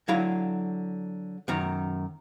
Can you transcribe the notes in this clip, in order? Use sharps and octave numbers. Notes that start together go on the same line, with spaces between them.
D3 F#3 E4 F5 A#5
F#2 D#3 A#5